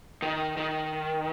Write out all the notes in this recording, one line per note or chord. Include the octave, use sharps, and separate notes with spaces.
D#3
D#3